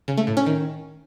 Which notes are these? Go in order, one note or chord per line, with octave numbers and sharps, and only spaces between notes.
C#3
A3
A2
C#4
D#3